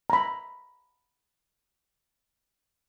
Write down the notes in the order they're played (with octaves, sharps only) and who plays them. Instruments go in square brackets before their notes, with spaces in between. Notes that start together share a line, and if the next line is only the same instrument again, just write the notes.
[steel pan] A#5 B5